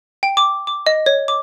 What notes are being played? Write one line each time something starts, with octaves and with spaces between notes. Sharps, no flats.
G5
D6
D6
D#5
C#5
D6